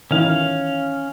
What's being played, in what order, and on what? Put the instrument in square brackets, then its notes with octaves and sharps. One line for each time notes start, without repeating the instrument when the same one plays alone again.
[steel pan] D#3 E3 E4 [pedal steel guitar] C#4 F5